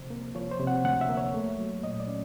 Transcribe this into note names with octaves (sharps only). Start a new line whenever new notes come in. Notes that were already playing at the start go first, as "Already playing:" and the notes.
Already playing: D2 C3 F3 C5
A#3
F3 C#5
C5
C3
F#5
D2 F#5
E5
A#3
C#5
A3
F#3
A#2 D#5
D5
C#4